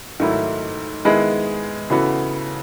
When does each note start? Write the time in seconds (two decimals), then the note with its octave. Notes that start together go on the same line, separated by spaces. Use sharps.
0.20 G#2 D#3 F#3 A3 E4
1.05 D#3 G#3 B3 E4 G#4
1.90 C#3 E3 B3 F#4 A4